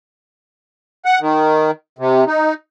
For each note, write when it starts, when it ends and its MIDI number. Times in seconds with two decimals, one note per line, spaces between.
1.05 1.19 78
1.21 1.71 51
1.98 2.24 48
2.27 2.54 63